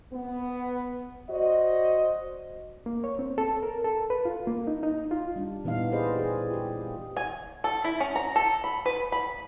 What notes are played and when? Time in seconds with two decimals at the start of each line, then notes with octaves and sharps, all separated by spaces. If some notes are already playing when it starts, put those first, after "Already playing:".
0.13 B3
1.29 F#4 C5 D5 D#5
2.86 A#3
3.04 C#5
3.19 C4
3.38 A4
3.63 A#4
3.84 A4
4.10 B4
4.25 F4
4.47 A#3
4.67 D#4
4.83 D#4
5.11 F4
5.36 G3 D4
5.65 A#2 E3 B3 D#4 F5
5.92 G4 G#4 B4 C5 D5 D#5
6.15 G4 G#4
6.50 F4 G4
7.17 G#5
7.64 A4
7.84 E4
8.00 C#4
8.16 A#5
8.36 A4
8.64 B5
8.86 B4
9.12 B5